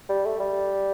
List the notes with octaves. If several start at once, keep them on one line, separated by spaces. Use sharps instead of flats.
G3
A3
G3